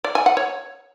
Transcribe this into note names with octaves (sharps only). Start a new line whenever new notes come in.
D5
G#5
F#5
C#5